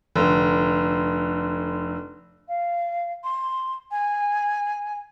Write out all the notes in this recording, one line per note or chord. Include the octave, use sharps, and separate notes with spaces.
F1 D3
F5
C6
G#5